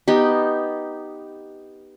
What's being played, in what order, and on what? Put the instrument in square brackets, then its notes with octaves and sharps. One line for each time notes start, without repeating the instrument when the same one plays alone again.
[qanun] B3 D#4 G4